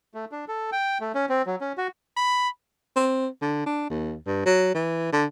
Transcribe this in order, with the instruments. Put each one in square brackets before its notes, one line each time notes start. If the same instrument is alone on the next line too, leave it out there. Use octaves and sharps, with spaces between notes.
[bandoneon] A3
D4
A4
G5
A3
C#4
C4
F#3
C#4
F#4
[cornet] B5
[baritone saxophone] C4
D3
D4
D#2
G2
F#3
E3
D3